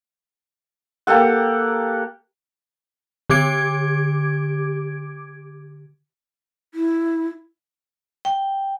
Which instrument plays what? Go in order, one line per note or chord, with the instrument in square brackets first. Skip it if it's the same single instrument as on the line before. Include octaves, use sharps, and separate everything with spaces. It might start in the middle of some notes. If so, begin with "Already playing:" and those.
[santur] A#3 G4 A4 F#5
[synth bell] D3 G4 D6 G#6 D7
[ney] E4
[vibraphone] G5